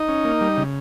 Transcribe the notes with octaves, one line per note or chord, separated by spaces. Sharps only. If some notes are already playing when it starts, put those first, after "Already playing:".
Already playing: D#4 D#5
C#4
A#3
G3
C#3